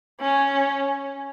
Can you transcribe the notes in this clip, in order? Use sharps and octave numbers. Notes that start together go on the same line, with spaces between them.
C#4